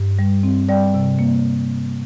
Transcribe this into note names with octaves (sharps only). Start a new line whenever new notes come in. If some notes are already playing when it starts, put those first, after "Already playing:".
Already playing: G2
G3
C4
G3 D5 G5
C3
A#3